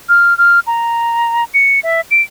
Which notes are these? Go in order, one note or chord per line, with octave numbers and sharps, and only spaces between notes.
F6
F6
A#5
C#7
E5
D7